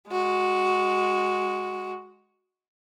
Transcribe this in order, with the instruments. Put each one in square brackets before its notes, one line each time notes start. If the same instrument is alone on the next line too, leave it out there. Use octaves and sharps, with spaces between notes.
[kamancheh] G#3 F#4